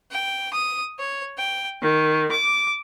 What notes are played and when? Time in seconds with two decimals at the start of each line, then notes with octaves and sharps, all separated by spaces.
0.11 G5
0.53 D#6
0.98 C#5
1.38 G5
1.82 D#3
2.30 D6